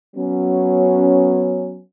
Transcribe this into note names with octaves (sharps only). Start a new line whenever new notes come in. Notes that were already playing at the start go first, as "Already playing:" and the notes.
F#3 B3 C#4